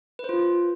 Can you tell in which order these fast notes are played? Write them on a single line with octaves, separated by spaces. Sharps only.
B4 C5 F4